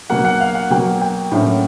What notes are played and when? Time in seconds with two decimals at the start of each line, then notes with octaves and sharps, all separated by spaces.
0.10 B2 F#3 A#3 F#5
0.25 F#5
0.40 F5
0.55 F#5
0.70 B2 F#3 A#3 G5
1.01 G5
1.32 A2 F#3 A#3 C#4